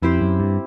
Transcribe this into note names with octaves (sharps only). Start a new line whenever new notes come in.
F2 C4 E4 G4 C5
F#2
G2